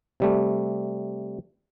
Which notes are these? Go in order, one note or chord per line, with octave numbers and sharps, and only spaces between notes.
C3 G3 A3